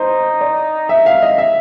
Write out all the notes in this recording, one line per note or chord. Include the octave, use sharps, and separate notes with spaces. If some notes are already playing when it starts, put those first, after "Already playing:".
Already playing: D#4 C5
D5
E5
F5
D#5
E5